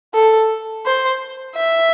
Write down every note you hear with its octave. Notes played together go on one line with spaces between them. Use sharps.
A4
C5
E5